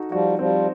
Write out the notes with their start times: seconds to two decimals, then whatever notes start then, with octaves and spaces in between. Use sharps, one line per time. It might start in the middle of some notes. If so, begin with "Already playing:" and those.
Already playing: D#4 F#4 A4
0.11 F3 G3 F#4
0.39 F3 G3 C4